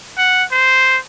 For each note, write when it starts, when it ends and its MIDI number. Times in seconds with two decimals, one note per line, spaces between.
0.18 0.44 78
0.51 0.98 72